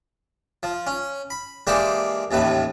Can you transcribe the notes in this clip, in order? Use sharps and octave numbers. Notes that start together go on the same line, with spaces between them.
F3
C#4
B5
E3 G#3 A#3 D4 G4 C5
A1 D#2 A2 B4